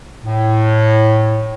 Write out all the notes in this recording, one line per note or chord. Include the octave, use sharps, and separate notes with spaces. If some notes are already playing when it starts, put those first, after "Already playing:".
A2